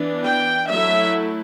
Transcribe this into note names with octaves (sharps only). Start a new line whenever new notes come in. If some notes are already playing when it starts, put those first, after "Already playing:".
Already playing: E3 B3 D4
G5
F#3 A3 E4 E5